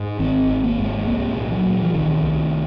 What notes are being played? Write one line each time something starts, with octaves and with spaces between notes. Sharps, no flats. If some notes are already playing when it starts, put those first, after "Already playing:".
Already playing: G#2
G#1 C4
G#1
A#3
G#2
C2 A#3
A#2
F#3
A#2
F3
C2 D#3
C2